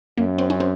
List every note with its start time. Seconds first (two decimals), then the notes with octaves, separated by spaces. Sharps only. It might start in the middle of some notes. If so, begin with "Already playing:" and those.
0.17 F#2 A#3
0.38 C4
0.50 C#4
0.60 C4